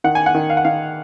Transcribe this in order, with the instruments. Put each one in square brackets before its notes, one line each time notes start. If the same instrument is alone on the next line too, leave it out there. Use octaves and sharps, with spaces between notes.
[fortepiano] D#3 F#5
G#5
F#5
D#3
F5
F#5
D#3 F5